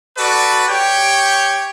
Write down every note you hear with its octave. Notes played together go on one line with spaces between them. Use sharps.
F#4 A4 B4 D5
G4 C#5 G5